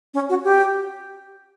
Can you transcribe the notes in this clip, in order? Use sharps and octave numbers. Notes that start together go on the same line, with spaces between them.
C#4
F#4
G4